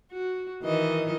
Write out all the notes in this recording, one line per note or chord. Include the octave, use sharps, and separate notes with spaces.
F#4
D#3 E3 D#5